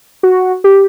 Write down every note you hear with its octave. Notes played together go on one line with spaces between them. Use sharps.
F#4
G4